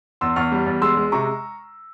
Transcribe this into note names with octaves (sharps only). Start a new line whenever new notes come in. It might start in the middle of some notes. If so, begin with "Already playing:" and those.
E2 C6 E6
E2 C#6 F6
G3
E2
G#3 C6 E6
G#3
C3 A#5 C#6